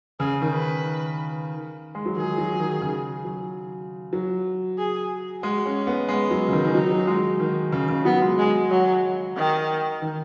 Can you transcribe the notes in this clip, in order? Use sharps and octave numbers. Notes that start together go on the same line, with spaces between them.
C#3 G#4
D#3
B4
G#3
F#3
D#3 G#4
F#3
D#3
C#3
F#3
F#3
G#4
G#3 F#4
C#4
B3
G#3
F#3
C#3
D#3
D#3
F#3 D#4
F#3
G#3
D#3
C#3
C#3
F#3 B3
G#3
G#3
F#3
D#3
D#3